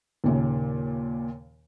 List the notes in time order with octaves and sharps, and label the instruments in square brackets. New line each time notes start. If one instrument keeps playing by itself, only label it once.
[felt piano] D#2 A#2 C#3